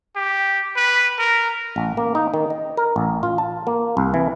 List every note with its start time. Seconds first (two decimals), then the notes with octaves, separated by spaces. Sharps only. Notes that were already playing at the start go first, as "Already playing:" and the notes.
0.16 G4
0.76 B4
1.19 A#4
1.76 A1
1.97 A#3
2.15 D#4
2.34 D#3
2.50 D#5
2.77 A#4
2.96 A1
3.23 F4
3.38 A5
3.67 A#3
3.97 C2
4.14 E3